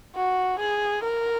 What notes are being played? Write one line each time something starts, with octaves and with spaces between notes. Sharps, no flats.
F#4
G#4
A#4